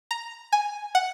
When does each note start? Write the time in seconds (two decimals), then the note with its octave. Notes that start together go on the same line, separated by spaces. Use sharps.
0.11 A#5
0.52 G#5
0.95 F#5